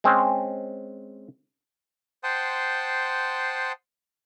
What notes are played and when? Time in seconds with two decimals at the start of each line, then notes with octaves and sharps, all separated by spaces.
0.04 G#3 C4 C#4
2.24 C5 F#5 G5 A5 C6 D#6